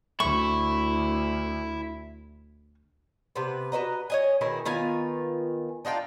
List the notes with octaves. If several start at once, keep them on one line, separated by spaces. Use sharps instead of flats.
D2 E4 C#6
C3 B3 B4
F#4 B4 D#5 A#5
C#5 D#5 G#5
B2 D#3 E4 G#4
D#3 B3 F4 G#5
D4 D#4 F4 G5